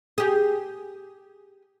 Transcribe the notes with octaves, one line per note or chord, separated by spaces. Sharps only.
G4 G#4